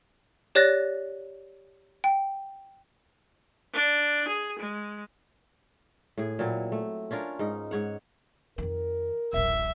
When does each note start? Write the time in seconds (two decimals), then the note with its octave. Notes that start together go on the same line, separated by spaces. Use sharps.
0.55 G4 C#5 D5 F#6 A6 A#6
2.04 G5
3.74 D4
4.28 G#4
4.59 G#3
6.17 A2 G#4
6.39 A#2 F#3 C4 E4
6.72 A3
7.11 C#4 D4 F4 A#4
7.39 G#2 D#4
7.71 G#2 C#5 F#5
8.58 F2 D#3 A#4
9.33 D1 A1 E5